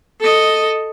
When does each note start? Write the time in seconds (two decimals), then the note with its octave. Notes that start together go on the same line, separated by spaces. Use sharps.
0.20 A4 D#5